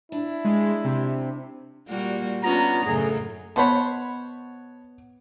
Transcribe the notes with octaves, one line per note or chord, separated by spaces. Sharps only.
D4 E4
G#3
C3
A#2 G3 A#3 F#4
B3 C#4 D4 F4 A#5
F#2 A2 C#3 G#4 A4
B2 B3 C5 C#5 F#5 A5 B5